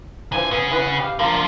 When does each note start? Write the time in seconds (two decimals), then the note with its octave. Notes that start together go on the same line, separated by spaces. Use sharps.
0.32 F2 D3 E3 F3 G#5
0.51 C#3 B3 G#4
0.71 E4 B4 F#5
0.99 G4 F5
1.19 D3 F3 A#3